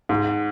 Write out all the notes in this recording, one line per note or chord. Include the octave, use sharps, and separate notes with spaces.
G#2